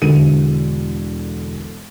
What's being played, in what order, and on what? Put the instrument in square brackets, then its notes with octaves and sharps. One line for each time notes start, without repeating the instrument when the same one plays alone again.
[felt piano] E1 D3 D#7